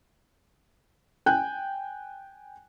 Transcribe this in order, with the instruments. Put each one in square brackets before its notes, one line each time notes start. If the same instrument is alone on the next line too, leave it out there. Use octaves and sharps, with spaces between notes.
[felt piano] G5 G#5 F#6 G6